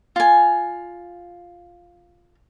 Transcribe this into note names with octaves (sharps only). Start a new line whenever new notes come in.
F4 G#5